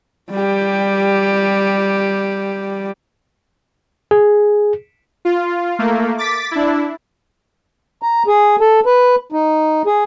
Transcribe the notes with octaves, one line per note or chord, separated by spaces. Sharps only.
G3 G4
G#4
F4
A3 A#3
D6 A6 B6
D4 E4
A#5
G#4
A4
B4
D#4
G#4